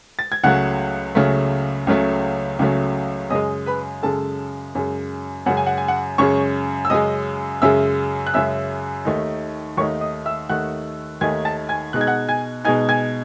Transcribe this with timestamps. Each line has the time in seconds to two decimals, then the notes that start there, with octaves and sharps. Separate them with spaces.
0.19 A6
0.32 G#6
0.44 C#2 C#3 F#3 A3 F#5 F#6
1.15 C#2 C#3 F#3 A3
1.87 C#2 C#3 F#3 A3
2.59 C#2 C#3 F#3 A3
3.30 F#2 C#3 G#3 D#5 D#6
3.66 B4 B5
4.03 F#2 C#3 G#3 A4 A5
4.75 F#2 C#3 G#3
5.46 F#2 C#3 G#3 F#5
5.57 G#5
5.67 F#5
5.78 G#5
5.88 F#5
6.18 F#2 C#3 G#3 C#5 C#6
6.85 E6
6.90 F#2 C#3 G#3 D#5 D#6
7.62 F#2 C#3 G#3 E5 E6
8.27 F#6
8.34 F#2 C#3 G#3 E5 E6
9.05 D#2 D#3 A3 D#4
9.77 D#2 D#3 A3 D#4 C#5 C#6
10.01 D#5 D#6
10.25 E5 E6
10.49 D#2 D#3 A3 D#4 F#5 F#6
11.21 D#2 D#3 A3 D#4 G#5 G#6
11.45 A5 A6
11.69 G#5 G#6
11.93 B2 G#3 D#4 F#6
12.01 G#6
12.07 F#5 F#6
12.29 G#5 G#6
12.65 B2 G#3 D#4 G#5 G#6
12.89 G#5 G#6